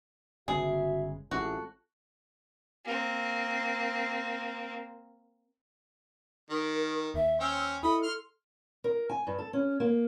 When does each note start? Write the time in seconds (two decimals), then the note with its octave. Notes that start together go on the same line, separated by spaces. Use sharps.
0.48 G1 C#3 G#3 F#4 G#4 E5
1.31 A1 G#3 C4 F4 F#4 A4
2.85 A#3 C4
6.50 D#3 A#4
7.14 D#2 E5
7.40 C#4 C5 G5 E6
7.83 E4 A4 D#5 B5
8.03 C6 F6
8.84 A#4
9.09 G#5
9.27 G2
9.39 A4
9.53 C#4
9.80 A#3